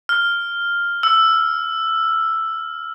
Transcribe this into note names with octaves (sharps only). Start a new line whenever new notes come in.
F6
E6